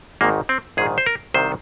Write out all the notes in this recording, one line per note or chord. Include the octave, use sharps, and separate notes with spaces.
G#1 G#2 D#3 A#3
C4
A#1 G#2 D#3 G#4
C5
A#4
C2 C3 D#3 C5